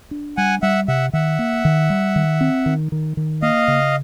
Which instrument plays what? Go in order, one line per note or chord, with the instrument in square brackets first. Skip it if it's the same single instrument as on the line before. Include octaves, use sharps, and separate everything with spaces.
[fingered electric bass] D4
[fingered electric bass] G3 [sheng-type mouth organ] F#5 G#5
[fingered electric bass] G3 [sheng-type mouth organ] E5 F#5
[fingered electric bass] C3 [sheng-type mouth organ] E5 F#5
[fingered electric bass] D#3 [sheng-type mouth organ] E5 F#5
[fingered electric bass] A#3
D#3
G3
D#3
C4
D#3
D#3
D#3
[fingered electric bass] A#3 [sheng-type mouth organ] D#5 F5
[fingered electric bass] C#3